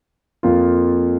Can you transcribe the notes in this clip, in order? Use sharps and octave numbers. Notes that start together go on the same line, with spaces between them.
F2 F3 A#3 F4